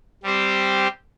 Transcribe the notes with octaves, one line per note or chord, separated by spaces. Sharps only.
G3 C4 G4 C5